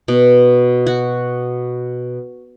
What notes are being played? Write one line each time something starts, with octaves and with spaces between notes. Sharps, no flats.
B2
F#4